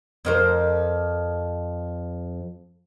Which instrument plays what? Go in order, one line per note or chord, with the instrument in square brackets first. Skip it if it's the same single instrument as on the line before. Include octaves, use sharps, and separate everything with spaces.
[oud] F2 A#4 C5